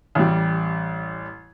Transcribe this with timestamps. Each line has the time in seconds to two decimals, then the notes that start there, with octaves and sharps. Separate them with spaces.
0.15 A1 G3